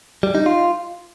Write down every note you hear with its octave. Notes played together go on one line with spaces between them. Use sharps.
G3
D#4
F4